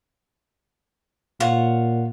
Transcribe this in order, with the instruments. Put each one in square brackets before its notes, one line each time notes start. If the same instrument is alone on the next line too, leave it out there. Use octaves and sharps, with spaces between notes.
[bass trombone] A#2 [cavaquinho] F4 C#5 F#5